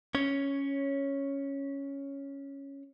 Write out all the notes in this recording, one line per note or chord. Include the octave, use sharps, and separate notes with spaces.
C#4 C#5